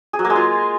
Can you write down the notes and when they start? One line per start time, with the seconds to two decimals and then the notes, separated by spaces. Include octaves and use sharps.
0.13 G#4
0.19 F#3
0.24 A#3
0.30 G#3
0.36 F4